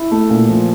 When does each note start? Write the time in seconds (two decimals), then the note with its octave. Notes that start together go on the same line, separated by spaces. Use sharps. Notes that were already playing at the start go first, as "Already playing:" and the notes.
Already playing: E4
0.11 A3
0.30 A#2
0.49 F3